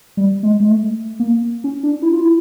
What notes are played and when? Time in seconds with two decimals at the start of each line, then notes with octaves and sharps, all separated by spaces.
0.17 G3
0.43 G#3
0.60 G#3
0.68 A3
1.20 A#3
1.64 C#4
1.83 D4
2.02 E4
2.13 F4
2.21 E4